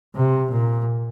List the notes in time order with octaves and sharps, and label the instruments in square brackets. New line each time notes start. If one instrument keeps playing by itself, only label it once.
[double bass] C3
A#2